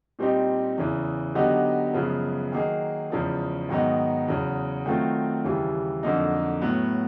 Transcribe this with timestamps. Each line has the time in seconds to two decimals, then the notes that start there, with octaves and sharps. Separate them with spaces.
0.19 A#2 G3 C4 D#4 G4
0.77 E2 C#3 E3
1.35 D3 F#3 B3 D#4 G4
1.94 F#2 C#3 F3 G#3 B3
2.52 D#3 F#3 A#3 D#4 G#4
3.10 E2 C#3 F3 G#3
3.69 G#2 D#3 F#3 B3 D#4
4.28 E2 C#3 F#3
4.86 D#3 F#3 A3 C4 F4
5.44 D#2 C#3 E3 G3
6.03 F2 D3 F#3 A#3 D#4
6.62 A2 F#3 B3